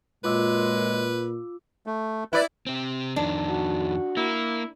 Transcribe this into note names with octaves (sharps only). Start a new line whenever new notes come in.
F#2 A#2 G#3 F4 B4 D6 E6
A3
E4 B4 D5
C3 C4
F2 D#3 D4
F#4
A#3 E4